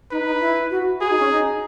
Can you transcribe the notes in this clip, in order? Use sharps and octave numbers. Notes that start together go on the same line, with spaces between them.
D#4 B4
D#4
E4
F#4
F#4 G#4
D#4
C#4
D#4